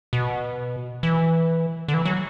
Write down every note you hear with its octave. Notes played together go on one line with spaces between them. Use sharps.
B2
E3
D3
E3
F#3